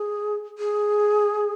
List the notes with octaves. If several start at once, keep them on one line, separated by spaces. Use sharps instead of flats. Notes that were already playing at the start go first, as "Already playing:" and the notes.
Already playing: G#4
G#4